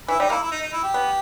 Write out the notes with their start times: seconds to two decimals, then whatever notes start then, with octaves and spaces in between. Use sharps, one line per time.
0.08 E3 E4
0.20 G3 D#4
0.30 A#3 E4
0.43 E4
0.52 D#4
0.62 D#4
0.73 E4
0.83 G4
0.94 B3